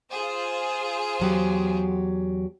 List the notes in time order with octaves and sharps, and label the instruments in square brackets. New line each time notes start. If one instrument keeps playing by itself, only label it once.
[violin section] F4 G#4 C5
[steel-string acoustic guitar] E2 F#3 G4